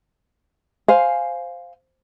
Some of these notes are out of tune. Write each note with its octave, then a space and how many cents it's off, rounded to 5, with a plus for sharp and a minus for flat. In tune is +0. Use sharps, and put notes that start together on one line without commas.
C5 +0 F5 +0 G#5 +0